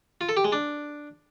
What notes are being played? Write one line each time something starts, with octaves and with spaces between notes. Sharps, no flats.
F4
A4
G4
G#3
D4